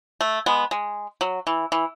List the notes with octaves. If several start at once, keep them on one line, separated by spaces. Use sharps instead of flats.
A3
G#3 B3
G#3
F#3
E3
E3